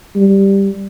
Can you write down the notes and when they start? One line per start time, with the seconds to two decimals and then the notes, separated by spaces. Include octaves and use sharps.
0.16 G3